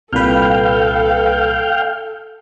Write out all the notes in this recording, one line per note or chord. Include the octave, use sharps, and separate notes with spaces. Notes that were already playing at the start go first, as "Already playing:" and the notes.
C2 A#2 A4 B4 F5 G5